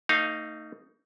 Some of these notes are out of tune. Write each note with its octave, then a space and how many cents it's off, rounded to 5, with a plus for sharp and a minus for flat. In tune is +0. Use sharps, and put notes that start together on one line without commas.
A3 +40 D#4 +0 F5 +0